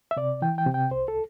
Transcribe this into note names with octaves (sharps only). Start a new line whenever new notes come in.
E5
C3 D5
E3 G5
G5
C3
G5
C2 C5
A4